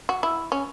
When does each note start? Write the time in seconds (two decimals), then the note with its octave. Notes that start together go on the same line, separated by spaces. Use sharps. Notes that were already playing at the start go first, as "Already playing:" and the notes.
0.09 F#4
0.23 E4
0.52 C#4